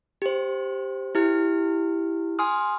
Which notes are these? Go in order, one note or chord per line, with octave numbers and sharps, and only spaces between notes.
G4 C5
E4 G4 F6
G#5 C6 D#6 F6